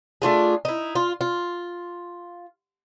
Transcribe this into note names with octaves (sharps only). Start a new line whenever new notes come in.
A3 D4 F4 G#4
D#4 E4
F4
F4